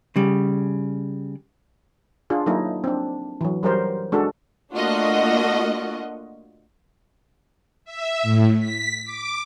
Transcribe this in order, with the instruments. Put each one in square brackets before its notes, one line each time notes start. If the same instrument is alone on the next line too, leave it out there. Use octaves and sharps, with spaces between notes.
[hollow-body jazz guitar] C#3 G3
[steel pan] D4 F4 G#4
F#3 A#3 D#4 E4
C4 D4
E3 F#3
F#3 G3 A#4 C5
G#3 D4 F#4 A4
[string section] A3 A#3 D4 F4 F#4 D#5
[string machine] E5
A2
B6
D6